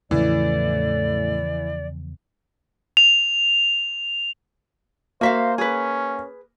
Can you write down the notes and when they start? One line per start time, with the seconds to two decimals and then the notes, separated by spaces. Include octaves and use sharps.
0.11 E2 A2 C#3 E3 F3 D5
2.97 F7
5.21 A#3 F#4 C5 E5 F5
5.58 C#4 G#4 B4